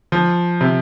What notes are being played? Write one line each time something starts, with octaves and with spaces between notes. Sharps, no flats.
F3
C3